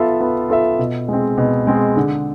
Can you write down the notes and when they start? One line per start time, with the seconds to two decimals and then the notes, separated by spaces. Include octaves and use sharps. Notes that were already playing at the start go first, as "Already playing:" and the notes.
Already playing: B3 F4 A4 E5
0.21 B3
0.50 F4 A4 E5
0.79 B2
1.08 G#3 C4
1.38 B2
1.67 G#3 C4
1.96 D3